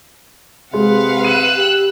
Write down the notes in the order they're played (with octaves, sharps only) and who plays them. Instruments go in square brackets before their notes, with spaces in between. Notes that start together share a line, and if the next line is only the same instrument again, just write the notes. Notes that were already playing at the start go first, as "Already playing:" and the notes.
[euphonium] C3 [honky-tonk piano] G#3 [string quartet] B4 F5 F#5
[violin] E6 F#6 [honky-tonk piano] D#7
[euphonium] G4